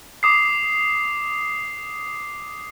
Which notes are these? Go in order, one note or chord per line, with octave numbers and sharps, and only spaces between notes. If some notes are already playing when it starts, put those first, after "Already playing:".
D6 D#6 C7